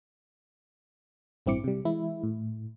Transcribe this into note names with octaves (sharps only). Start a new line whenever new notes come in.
A1 G2 C4 E4 D6 C#7
C3 G3
E3 G#3 E4
A2